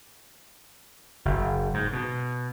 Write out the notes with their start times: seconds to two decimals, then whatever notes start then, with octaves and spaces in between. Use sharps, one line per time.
1.25 F#1
1.74 G#2
1.93 B2